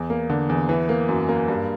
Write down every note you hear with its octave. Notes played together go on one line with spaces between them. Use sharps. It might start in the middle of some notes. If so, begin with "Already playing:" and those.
Already playing: E2
A#3
D3
E2
E3
A#3
F#2
A#3
G2